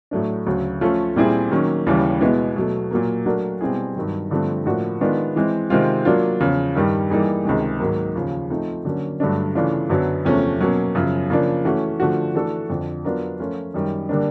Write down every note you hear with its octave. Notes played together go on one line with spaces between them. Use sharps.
A2 F#3 A3 D4
D2 C#3 F#3
F3 A3 C#4 F4 A4
A#2 G3 C4 E4 G#4
D#3 F#3 A#3 C#4
D#2 C#3 E3 G3
B2 G#3 B3 E4
B2 F#3 A3
A#2 F#3 A#3
F#3 A3 D4 F#4 A#4
B2 G3 C4 E4 G#4
G2 D#3 F#3
G2 D3 F3 A3 C4
A2 F3 A#3 D4 F#4
D#3 G#3 B3 D4 F4
E3 G#3 C4
C3 D#3 G#3 C4 F4
F#3 A#3 D4 F4
E2 C#3 F3
G2 D#3 G3
E3 G3 A#3 D#4 G#4
C#2 C3 D#3 G#3
G#2 D#3 F#3 A#3
D#2 C#3 F3
F3 A3 C4 D#4
D3 F#3 A#3 C#4
G2 D3 F#3 A3 D4
C#3 E3 A3 D4 F4
F#2 D3 F#3 B3
E2 C3 F3 A3 C#4
B2 F#3 A#3 C#4
F#2 C#3 F3
C#3 F3 A#3 D4
E3 A3 C#4 F#4
D3 F3 A3 D4 F#4
E3 A3 D4 F#4 A4
F2 D3 F3
F#3 B3 D4 F4 A#4
F3 A3 C#4 F4 A#4
F#2 D#3 G3
D3 G3 A#3 D4